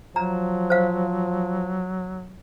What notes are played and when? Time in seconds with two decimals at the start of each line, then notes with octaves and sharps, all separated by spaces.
0.16 F3 F#3 A#5
0.70 C5 F5